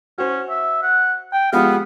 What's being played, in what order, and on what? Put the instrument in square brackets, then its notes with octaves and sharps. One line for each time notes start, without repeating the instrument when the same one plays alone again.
[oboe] C#4 [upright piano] F#4 C5
[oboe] E5
F#5
G5
[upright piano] F3 G#3 G4 [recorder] B3 [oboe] F5